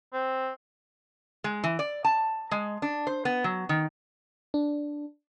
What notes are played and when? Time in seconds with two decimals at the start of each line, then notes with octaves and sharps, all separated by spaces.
0.13 C4
1.44 G#3
1.64 E3
1.79 D5
2.04 A5
2.51 G#3
2.82 D4
3.07 C5
3.25 B3
3.44 F#3
3.69 D#3
4.54 D4